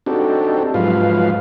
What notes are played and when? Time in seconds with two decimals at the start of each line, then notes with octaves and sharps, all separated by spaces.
0.06 C4 D4 D#4 F#4 G4 A4
0.74 G#2 F3 F#3 F4 B4 F5